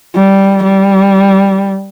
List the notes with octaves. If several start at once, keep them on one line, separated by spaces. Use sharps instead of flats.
G3
G3